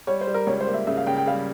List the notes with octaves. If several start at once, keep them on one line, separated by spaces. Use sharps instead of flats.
G3 C#5
C5
G3
A#4
C#2 C#5
C5
A#3
E5
C#3 E5
F5
C#3 G5
G5
G3 F5